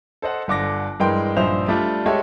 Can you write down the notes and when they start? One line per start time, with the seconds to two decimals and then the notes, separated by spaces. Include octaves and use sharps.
0.22 A4 C5 D#5 F#5
0.48 G1 D3 D6 A#6
1.00 G2 E3 G#3 A#4 G5 C6
1.36 A#1 G2 D#4 C5 E5 F7
1.68 G3 A3 D4 F4
2.06 G#3 A3 G4 A4 C#5 E5